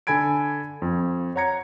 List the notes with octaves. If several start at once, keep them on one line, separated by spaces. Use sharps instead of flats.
D3 A4 G#5 B5 G#6 D7
F2
C#5 F#5 A#5 G#6 C#7